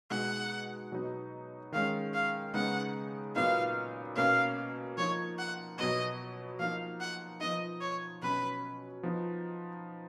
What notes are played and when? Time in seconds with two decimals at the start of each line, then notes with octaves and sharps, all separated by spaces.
0.11 B2 G#3 D#4 F#5
0.92 B2 F#3 B3 D#4
1.72 D#3 G#3 C#4 F5
2.14 F5
2.54 C#3 G#3 B3 D#4 F#5
3.35 A#2 F#3 B3 D#4 F5
4.16 B2 A#3 C#4 F5
4.98 F3 A#3 D#4 C#5
5.38 F#5
5.78 B2 F#3 B3 D#5
6.59 F3 A#3 D#4 F5
7.01 F#5
7.41 F3 B3 D#4 D#5
7.81 C#5
8.23 B2 F#3 C#4 B4
9.03 F3 B3 D#4